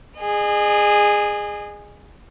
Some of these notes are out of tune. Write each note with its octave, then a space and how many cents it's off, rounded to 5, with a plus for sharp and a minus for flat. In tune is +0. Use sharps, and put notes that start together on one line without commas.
G#4 -10 D#5 -40